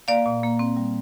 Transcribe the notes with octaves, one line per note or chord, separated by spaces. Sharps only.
A#3 D5 F5
A#2
A#3
C4
G3